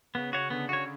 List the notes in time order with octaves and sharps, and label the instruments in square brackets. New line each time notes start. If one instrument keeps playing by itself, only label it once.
[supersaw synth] C#3 [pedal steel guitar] B3
[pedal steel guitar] F#4 C#5
[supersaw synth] D3 [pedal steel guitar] B3
[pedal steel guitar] F#4 C#5